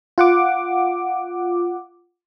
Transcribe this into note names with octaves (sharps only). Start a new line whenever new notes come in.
F4 F#5 D6